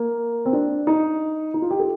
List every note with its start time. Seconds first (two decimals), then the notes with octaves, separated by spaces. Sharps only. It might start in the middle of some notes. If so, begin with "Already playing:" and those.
Already playing: A#3
0.46 C4
0.53 D4
0.87 D#4
1.54 D#4
1.62 F4
1.70 G4
1.80 A4